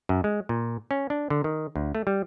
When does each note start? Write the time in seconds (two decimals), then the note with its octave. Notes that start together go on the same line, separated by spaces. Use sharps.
0.09 F#2
0.24 G#3
0.49 A#2
0.91 C#4
1.10 D4
1.30 D3
1.44 D#3
1.76 D2
1.95 A3
2.07 G3